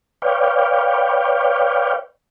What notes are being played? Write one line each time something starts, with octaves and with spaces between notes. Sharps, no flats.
B4 C#5 D5 F5 G5